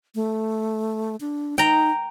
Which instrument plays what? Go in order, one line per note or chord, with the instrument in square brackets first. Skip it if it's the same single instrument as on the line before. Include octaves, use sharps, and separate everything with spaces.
[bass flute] A3
D4
[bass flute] D#4 [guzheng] G5 A#5